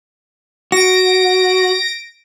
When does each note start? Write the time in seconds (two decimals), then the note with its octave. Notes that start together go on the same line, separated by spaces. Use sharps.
0.72 F#4 A#6 D7